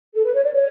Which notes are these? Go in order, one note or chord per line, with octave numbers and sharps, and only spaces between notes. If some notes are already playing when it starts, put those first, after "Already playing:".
A4
B4
C#5
D5
C#5